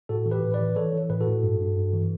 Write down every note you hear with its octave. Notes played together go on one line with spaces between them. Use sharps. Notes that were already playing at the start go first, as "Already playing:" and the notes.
A2 F#4 A4
E3
G4 B4
A2
B4 D5
E3
E3 A4 C#5
E3
A2 B4
F#4 A4
A2
G2
G2
G2
E3